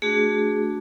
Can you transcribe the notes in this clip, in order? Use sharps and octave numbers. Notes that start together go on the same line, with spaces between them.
A3 D4 F#4 G#4